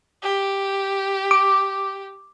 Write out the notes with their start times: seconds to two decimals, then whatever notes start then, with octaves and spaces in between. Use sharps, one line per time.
0.23 G4
1.31 D6